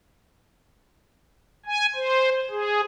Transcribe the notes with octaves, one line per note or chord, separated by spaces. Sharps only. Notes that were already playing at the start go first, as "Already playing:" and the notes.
G#5
C5
G#4